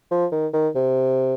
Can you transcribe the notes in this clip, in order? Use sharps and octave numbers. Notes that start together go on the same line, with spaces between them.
F3
D#3
D#3
C3